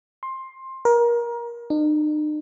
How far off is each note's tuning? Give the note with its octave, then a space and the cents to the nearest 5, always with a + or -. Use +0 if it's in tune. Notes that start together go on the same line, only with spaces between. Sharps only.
C6 +15
A#4 +25
D#4 -45